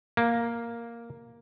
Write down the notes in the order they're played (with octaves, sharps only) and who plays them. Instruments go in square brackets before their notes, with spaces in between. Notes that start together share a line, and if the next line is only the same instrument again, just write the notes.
[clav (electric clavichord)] A#3